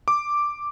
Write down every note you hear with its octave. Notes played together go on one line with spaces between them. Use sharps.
D6